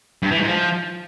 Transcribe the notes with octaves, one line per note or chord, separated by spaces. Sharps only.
G2
E3
G#2
F3